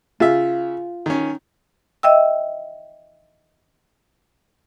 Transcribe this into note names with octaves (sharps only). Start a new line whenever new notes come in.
C#3 F4 E5
D#3 C#4
D#5 E5 G5 E6